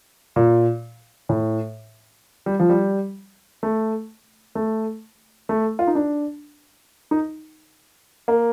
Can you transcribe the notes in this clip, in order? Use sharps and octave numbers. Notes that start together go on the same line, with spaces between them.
A#2
A2
G3
F3
G3
A3
A3
A3
F4
D#4
D4
D#4
A#3